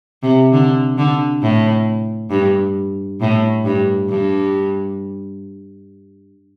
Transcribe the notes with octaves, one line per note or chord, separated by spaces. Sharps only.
C3
D3
D3
A2
G2
A2
G2
G2